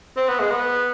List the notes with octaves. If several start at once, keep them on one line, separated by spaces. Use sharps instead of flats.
C4
B3
G#3
B3